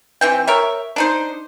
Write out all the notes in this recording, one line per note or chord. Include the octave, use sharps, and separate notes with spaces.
E3 C4 G5
A#4 C#5 E5
D4 D#4 C5